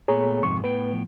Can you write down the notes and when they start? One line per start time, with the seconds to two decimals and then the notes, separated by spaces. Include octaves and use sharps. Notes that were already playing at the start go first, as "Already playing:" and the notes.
0.08 A#2 A3 B3 G#4 C#5 A#5
0.43 F2 G#2 C3 C#6
0.64 A2 B3 B4 G5
0.93 F3